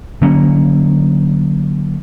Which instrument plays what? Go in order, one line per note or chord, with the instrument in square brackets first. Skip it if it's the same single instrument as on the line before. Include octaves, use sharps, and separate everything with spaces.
[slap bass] D3 F#3 A#3 C#4